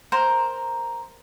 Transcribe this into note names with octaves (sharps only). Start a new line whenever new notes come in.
A#4 C5 A#5